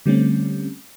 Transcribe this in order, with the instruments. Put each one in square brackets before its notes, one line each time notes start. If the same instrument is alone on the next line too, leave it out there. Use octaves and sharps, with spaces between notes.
[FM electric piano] D3 G3 A3 C4 C#4